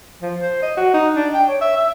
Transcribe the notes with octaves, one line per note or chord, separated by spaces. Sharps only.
F3
C5
D#5
F#4
D#4
D4
G5
C#5
E5
E5